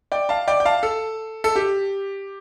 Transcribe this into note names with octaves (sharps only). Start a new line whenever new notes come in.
D5 G5
F5 A5
D5 G5
G5
F5 A5
A4
A4
G4